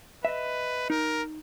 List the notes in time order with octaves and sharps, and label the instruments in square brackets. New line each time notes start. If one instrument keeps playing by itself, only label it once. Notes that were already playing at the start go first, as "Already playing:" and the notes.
[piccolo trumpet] B4 [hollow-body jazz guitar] D#5 E5
[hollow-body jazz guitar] D#4 [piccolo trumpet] A#4